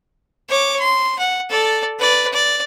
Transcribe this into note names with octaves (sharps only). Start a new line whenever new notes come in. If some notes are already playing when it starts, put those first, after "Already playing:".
C#5 D6
C6
F#5
A4 D5
B4 D5
D5